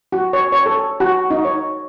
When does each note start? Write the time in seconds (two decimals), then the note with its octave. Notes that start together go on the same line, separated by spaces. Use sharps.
0.12 F#4
0.33 C#5
0.52 C#5
0.66 A4
1.00 F#4
1.30 D#4
1.45 C#5